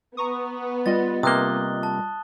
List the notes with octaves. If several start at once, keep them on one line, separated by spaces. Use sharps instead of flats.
B3 A#5 C#6 D#6
G3 F4 D#5 A6
C3 A#3 D#6 F#6 G7
A5